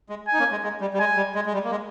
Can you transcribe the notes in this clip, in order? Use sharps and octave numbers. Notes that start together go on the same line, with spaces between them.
G#3
G#5
D#4
A#3 C#4
G#3
G#3
G3
G3
G#3 G#5
G3
G#3
G#3
G3
A#3
G#3